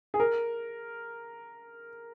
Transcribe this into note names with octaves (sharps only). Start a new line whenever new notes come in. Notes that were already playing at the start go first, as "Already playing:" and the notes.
G#4
A#4